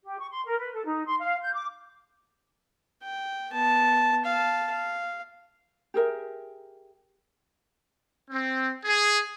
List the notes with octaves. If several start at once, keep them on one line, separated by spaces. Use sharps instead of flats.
G4
C#6
C6
A#4
B4
A4
D#4
C6
F5
G6
D6
G5
B3 A5
F5 A5
F5
G4 G#4 A#4 E5
C4
G#4